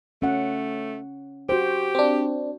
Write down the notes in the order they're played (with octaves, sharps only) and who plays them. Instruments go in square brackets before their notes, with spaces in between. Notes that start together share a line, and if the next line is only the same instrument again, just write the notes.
[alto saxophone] A3 [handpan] C#4 F#5
[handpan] F#4 C5 [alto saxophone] G4
[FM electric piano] C4 D4